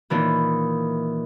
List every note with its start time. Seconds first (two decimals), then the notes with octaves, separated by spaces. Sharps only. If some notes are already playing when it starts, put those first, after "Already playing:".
0.10 A#2 D#3 E3